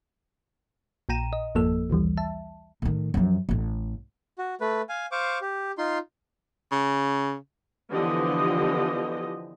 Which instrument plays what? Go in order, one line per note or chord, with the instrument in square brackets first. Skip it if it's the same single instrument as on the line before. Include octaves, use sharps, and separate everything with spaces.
[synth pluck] A#1 A#2 G5 A#5 D#7 E7
D#5
G#1 F2 F3 A#3 A4 E6
A#1 D#2 E3 G3
E5 A5
[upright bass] A2 D#3
F#2 F3
A1 A2
[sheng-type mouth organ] F#4
A3 B4
F5 G#5
C5 F5 C#6 D6
G4
D#4 F4 C6
[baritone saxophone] C#3
[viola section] D3 E3 F3 B3 G4 D#5